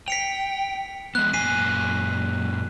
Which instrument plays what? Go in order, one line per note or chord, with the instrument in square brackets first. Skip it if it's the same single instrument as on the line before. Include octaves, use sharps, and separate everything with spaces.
[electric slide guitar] G5 [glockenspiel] B6 C#7 F7
[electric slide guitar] G#3 B3 [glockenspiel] F#6
[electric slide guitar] F#2 A#2 G#5 [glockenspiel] B6 C7 D#7